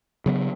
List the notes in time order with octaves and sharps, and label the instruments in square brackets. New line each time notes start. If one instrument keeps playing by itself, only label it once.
[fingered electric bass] C#3 F#3 B3